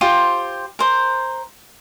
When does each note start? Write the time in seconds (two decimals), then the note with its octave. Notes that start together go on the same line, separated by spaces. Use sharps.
0.01 F4 G4 C5
0.79 A#4 C5